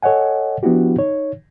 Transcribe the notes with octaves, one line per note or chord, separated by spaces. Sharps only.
A4 C#5 D#5 F#5 G#5
F3 B3 D4 E4 F#4 G4
D#4 C#5